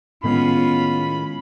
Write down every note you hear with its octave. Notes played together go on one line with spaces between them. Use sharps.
A2 D#3 G#3 B3 C#4 F4 B5